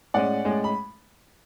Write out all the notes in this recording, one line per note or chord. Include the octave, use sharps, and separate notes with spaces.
A2 G#3 C#4 D5 F#5
A2 G#3 C#4
B5